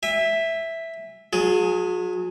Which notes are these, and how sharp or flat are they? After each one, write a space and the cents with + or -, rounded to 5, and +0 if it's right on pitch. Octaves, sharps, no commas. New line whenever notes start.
E5 +0 G#5 -40
F#3 -40 G#4 +5